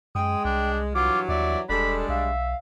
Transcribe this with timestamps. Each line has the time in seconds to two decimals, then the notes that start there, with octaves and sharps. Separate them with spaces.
0.15 F#2 G#3 G5 D#6
0.45 C2 D4
0.95 G2 E3 F#3 F4 D6
1.29 D#2 D5 E5
1.69 E1 G3 G#3 D4 A4 B5
2.09 B1 E5 F5